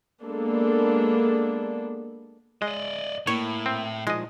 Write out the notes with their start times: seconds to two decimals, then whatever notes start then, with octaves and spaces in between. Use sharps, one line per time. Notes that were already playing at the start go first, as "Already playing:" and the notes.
0.24 G#3 A#3 B3 D4 A4
2.62 G#3 D5 D#5
3.27 A2 A#3 E4 C#5
3.66 C4
4.07 A#2 D#3 F3 G#3 D#5